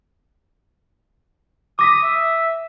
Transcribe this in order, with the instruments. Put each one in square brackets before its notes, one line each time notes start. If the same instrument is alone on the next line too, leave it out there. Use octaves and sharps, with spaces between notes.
[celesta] D6 A#6 B6 [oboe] D#6
[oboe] E5